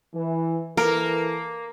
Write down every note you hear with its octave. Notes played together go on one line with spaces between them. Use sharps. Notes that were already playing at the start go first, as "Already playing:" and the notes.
E3
E3 A#3 A4 A#4